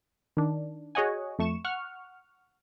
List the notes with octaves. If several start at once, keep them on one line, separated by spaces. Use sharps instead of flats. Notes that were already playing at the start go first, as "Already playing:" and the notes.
D#3 D4
F#4 G#4 C#5 D#5 F#5 G#5
F2 A3 C#6 E7
F#5 C#6 F6